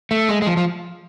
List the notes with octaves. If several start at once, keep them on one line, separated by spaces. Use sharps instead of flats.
A3
G#3
G#3
F3
F3